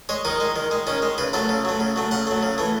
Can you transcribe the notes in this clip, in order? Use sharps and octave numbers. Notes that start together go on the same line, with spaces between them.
G#3 C#5
D#3 D#4
G#3
D#3
G#3
D#3 C#4
G#3
C#3 B4
F#3 A3 A4
C#3
F#3 A3
C#3
F#3 A3
C#3 F#5
F#3 A3
C#3
E3 A3